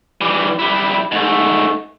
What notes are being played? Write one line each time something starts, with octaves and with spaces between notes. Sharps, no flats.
E3 G3
G3 E4
G#2 A3